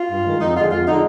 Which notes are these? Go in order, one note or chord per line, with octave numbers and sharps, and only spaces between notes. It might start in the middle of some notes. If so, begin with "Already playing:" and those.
Already playing: F4
G2
D#3 G#3
F2 D#4
D3 G#3 F4
F2 F4
D3 G#3 D#4